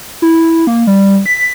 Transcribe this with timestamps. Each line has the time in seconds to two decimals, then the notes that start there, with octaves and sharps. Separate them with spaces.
0.22 E4
0.67 A#3
0.87 G3
1.26 B6